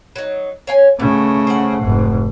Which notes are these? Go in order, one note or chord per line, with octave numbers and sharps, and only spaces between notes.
F#3 D#4
C#5 F5 G#5
C#3 A3 B3
C5 F#5
F1 G#2